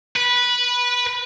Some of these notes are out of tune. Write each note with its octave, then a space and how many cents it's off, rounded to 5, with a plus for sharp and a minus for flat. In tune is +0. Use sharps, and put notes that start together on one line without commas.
B4 -15